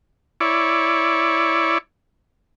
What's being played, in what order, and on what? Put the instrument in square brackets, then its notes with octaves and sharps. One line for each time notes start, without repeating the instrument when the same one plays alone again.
[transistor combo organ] E4 C#5 D5